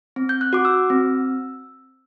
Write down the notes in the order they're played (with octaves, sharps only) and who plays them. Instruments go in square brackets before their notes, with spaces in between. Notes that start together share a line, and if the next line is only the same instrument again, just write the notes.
[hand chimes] C4
G6
F#6
F#4 D6
E6
C4